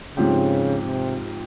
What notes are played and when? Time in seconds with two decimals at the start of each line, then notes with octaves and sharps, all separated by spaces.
0.17 G#2 C#3 F3 C4 G4
0.86 C3